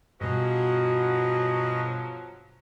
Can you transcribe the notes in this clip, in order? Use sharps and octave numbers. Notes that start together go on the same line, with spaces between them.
G2 B2 F3 F#3 F#4 G#4 B4 D#5